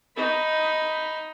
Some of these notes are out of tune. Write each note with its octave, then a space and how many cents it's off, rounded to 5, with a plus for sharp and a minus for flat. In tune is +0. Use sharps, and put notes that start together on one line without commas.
D#4 +5 B5 +0